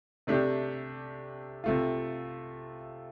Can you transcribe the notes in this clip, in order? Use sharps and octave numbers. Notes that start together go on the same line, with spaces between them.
C3 A3 D4 G4
C3 A3 F4